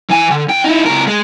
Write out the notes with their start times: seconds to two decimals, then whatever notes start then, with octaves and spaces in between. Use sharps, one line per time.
0.10 E3 G#5
0.31 D3
0.48 E2 G5
0.64 D#4 E4
0.86 C#2 A#4
1.07 G#3